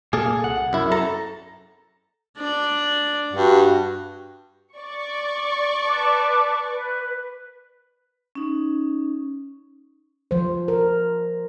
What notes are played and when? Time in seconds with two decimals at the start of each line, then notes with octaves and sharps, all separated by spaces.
0.13 A#2 A#3 G#4 A4
0.43 C2 F#5
0.73 F#2 E4
0.92 A4 A#5
2.38 D4 D5
3.33 G2 F#4
4.76 D5 C#6
5.83 B4 A5 D6
6.68 B4
8.35 C#4 D#4
10.31 F3 C5
10.68 A#4